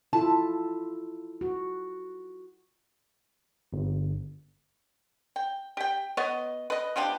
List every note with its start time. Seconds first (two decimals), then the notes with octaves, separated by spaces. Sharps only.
0.13 E4 F4 A4 A5
1.41 F#4
3.73 G1
5.36 G5
5.77 G4 G5
6.17 B3 C#5 D#5
6.70 B4 D#5
6.96 F3 B3 D4 G4